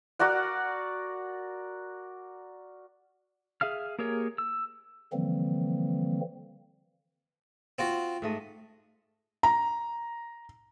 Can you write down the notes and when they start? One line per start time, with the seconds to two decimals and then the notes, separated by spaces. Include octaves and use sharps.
0.19 F#4 A#4 D5 F#5
3.61 G#4 E5 F5 F6
3.99 A#3 G4 G#4 A#4 C#5
4.38 E6
5.13 D3 E3 F3 G3 A#3 C4
7.79 C4 F4 F#4
8.22 G#2 A3 D#5
9.43 A#5